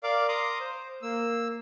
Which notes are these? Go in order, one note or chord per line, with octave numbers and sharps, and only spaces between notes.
A#4 D5 F5 D6
A#5 C6 D6 D#6
C5
A#3 E6